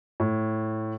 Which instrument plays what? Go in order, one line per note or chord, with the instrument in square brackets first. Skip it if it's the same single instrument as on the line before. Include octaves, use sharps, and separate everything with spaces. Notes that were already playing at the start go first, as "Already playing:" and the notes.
[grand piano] A2